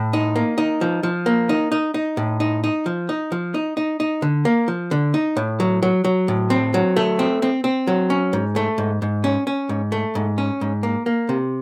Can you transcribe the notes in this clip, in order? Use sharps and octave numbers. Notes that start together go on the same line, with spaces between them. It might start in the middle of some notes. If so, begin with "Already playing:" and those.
Already playing: A2
D#4
A#3
D#4
F3
F3
A#3
D#4
D#4
D#4
A2
D#4
D#4
F3
D#4
F3
D#4
D#4
D#4
D3
A#3
F3
D3
D#4
A2
F#3
F#3
F#3
A2
C4
F#3
A3
C4
C4
C4
F#3
C#4
G#2
A3
G#2
G#2
C#4
C#4
G#2
A3
G#2
C#4
G#2
A#3
A#3
C3